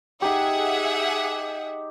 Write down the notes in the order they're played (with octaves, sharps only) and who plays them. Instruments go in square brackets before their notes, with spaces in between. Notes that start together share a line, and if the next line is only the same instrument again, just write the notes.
[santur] D#4 G4 [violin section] G#4 E5 F#5